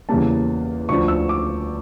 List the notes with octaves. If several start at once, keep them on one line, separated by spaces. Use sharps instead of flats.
E2 C#3 G3 A#3 A5
D2 D3 F3 C#6
E6
D6